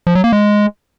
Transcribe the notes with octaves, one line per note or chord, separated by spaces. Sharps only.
F3
F#3
A#3
G#3